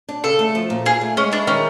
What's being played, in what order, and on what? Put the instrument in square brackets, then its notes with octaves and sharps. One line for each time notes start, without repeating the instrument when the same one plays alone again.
[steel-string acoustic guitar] D4
[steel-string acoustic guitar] C#3 [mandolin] A4
[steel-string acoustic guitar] A3
F3
A#2
[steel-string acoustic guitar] A#2 [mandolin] G#4
[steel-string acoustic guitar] A3
[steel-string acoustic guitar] G#3 [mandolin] C#4
[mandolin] D4 [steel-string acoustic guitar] E4
[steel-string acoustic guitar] D#3 [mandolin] C#4